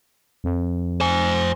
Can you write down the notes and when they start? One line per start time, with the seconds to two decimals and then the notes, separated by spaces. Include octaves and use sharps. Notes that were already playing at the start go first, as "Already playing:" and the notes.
0.44 F2
1.01 C5 G#5